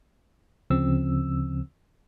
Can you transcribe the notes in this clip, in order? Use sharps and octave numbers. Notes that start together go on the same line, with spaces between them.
D2 C#3 F3 C4 E6